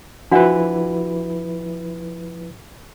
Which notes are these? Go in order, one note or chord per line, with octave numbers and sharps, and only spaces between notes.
F3 D4 E4 F#4 B4 F#5